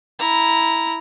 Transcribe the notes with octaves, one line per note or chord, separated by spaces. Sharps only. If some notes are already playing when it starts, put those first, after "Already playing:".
E4 A#5